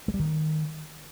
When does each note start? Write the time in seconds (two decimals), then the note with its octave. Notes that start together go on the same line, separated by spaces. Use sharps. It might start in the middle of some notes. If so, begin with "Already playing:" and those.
0.08 G#3
0.14 G3
0.20 D#3